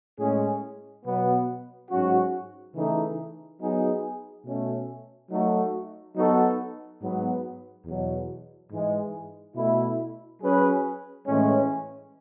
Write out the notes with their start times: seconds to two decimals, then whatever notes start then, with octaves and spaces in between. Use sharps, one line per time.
0.19 A2 G#3 C#4 G#4
1.05 B2 F#3 B3
1.90 G#2 F#3 C#4 F#4
2.75 C#3 E3 A3 D#4 A4
3.60 F#3 B3 D#4 G#4
4.45 B2 A3 C#4
5.30 F#3 A3 D#4 F#4 A4
6.16 F#3 B3 D#4 F#4 A4
7.01 G#2 F#3 B3
7.85 E2 B2 F#3
8.71 G#2 E3 G#3
9.56 B2 A3 E4
10.42 F#3 C#4 G#4 B4
11.27 A2 E3 G#3 C#4